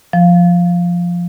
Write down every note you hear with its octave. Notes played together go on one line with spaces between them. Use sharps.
F3